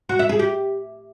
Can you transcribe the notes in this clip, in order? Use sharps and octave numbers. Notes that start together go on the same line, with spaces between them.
F#4
E5
G#4
G4